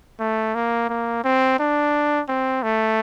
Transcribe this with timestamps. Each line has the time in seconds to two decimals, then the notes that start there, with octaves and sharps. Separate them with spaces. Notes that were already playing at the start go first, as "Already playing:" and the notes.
0.20 A3
0.55 A#3
0.89 A#3
1.24 C4
1.59 D4
2.28 C4
2.63 A3